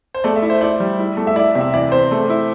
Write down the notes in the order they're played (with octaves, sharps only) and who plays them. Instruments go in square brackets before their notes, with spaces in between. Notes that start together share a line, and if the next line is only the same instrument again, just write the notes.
[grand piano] C5
[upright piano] A3 [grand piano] D5
[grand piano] E5
[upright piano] E4
[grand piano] C5
[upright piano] E4 [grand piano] D5
[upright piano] G3
E4
A3
[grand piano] E5
[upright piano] E4 [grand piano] D5
[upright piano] C3
[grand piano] E5
[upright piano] E3 [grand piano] D5
[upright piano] C4 [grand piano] C5
[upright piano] A3
E4